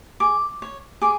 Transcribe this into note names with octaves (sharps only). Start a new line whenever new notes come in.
G#4 D6
C#5
G#4 D6